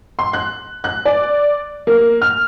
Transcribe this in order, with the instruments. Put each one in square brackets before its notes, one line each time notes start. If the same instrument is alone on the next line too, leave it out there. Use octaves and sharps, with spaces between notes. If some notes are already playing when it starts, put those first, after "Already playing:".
[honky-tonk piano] C6
F#6
F#6
D5
A#3
F6